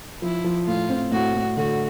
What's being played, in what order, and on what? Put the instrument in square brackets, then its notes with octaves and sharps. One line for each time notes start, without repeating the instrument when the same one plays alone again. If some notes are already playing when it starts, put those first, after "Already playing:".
[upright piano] F3 [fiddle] E4
[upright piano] F3
[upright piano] A2 [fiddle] F4
[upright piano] C4
[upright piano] A2 [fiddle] F#4
[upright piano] A2
[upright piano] D3 [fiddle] F#4